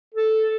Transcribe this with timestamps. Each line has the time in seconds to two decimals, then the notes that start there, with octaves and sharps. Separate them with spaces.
0.14 A4